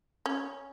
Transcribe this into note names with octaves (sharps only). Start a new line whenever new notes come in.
C#4